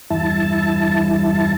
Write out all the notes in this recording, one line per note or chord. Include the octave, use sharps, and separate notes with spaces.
E2 G2 E4 A5